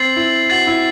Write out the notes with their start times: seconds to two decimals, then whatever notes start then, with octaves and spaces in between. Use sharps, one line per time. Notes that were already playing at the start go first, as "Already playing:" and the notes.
Already playing: C4 A6 C7 F#7
0.16 E4
0.50 F#4 A6 C7 F#7
0.67 E4